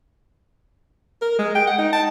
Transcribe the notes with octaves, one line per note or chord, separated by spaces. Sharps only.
A#4
G#3
G5
F#5
D#4
A5